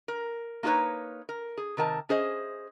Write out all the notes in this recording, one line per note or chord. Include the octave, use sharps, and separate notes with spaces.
A#4
A#3 D#4 F4 G#4 B4 C#5
A#4
G#4
C3 D#3 A#4 G#5 A5
C#4 G#4 C5 D#5